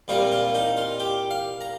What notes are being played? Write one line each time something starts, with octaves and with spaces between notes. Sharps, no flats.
C2 A#2 G3 A#3 F4
F4
D#4
F4
G4
F5
A#5